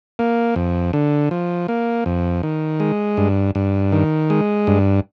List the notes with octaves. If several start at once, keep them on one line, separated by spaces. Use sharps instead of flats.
A#3
F2
D3
F3
A#3
F2
D#3
G#3
G2
G2
D#3
G#3
G2